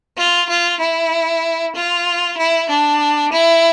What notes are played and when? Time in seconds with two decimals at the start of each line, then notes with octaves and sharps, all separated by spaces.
0.18 F4
0.50 F4
0.80 E4
1.75 F4
2.38 E4
2.70 D4
3.33 E4